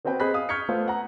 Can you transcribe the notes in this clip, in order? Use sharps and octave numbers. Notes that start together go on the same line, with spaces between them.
B3 C4 F#4 B4 G5
C4 G#4 D#5 B5 F#6 B6
F5 D#6
C#6 F6 G6 G#6 B6 C#7
A3 B3 F4 C5 F5
F#5 A#5